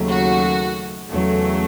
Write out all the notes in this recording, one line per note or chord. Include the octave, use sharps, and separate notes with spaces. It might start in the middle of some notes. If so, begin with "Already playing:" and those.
Already playing: D#2 C#3 F#3 A3
F#4
E2 C#3 F#3 A3